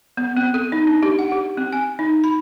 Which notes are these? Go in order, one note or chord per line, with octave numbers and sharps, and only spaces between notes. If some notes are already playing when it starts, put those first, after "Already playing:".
B3
C4
A4
D#4
D4
G4
F#5
G4
C4
G#5
D#4
B5